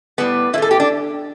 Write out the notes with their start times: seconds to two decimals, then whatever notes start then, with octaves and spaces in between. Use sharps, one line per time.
0.18 A2 G3 B3
0.53 A2 E4
0.58 A3 A4
0.71 G4
0.80 D4